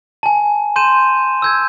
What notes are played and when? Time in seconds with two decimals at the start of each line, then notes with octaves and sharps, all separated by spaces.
0.23 G#5 A5
0.76 C6 G6 D#7 E7
1.42 E6 G6 G#6